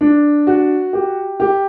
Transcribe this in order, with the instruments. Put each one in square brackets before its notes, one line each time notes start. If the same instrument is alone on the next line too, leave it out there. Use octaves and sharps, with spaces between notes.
[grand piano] D4
F#4
G4
G4